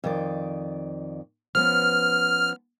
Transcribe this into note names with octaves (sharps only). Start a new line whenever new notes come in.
F2 D#3 D5
F3 B3 C#4 F6